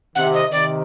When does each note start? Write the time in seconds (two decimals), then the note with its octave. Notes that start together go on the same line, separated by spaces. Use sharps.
0.15 C3 D#3 F#5
0.34 D#5
0.51 C3 D#3 D5